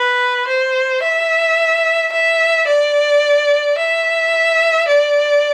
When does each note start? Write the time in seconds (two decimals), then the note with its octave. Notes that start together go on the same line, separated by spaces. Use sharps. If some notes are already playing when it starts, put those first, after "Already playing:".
Already playing: B4
0.47 C5
1.02 E5
2.12 E5
2.67 D5
3.77 E5
4.88 D5